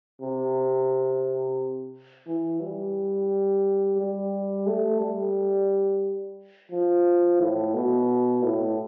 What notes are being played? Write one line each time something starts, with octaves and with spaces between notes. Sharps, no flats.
C3
E3
G3
G3
A3
G3
F3
A2
B2
A2